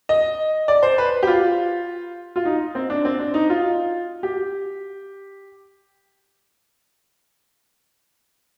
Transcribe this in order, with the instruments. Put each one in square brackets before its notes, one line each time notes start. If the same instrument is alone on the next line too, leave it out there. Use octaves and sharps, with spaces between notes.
[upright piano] D#5
D5
C5
B4
G4
F4
F4
D#4
C4
D4
C4
D4
D#4
F4
G4